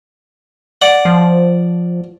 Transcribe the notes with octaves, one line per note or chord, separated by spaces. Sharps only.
D5 F#5
F3